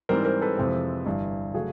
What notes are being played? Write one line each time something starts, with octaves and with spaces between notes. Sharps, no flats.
G#2 E3 G3 C4 A#4 C5
A#4 C5
A4 B4
F2 C3 E3 G#3 C4
G1 G2 E3
C#3 F#3 A3 F#4 G#4